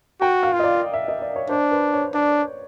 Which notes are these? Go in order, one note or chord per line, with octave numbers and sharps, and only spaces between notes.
F#4 G5
F5
F4
D#5
D5
E5
D#5
D5
C#5
D4 C5
B4
C#5
D4 D5